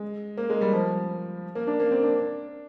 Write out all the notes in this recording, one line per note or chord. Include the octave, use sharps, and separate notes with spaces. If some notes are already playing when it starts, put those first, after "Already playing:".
Already playing: G#3
A#3
G#3
G3
F3
A#3
D4
A#3
C4
D4